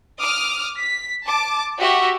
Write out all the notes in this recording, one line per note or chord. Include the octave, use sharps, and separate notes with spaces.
D6 D#6 F6
B6
A5 D6
F#4 G4 E5